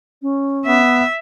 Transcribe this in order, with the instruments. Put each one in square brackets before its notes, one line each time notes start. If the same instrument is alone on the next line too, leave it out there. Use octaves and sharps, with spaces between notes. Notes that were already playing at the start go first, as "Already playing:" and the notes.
[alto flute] C#4
[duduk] B3 [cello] E5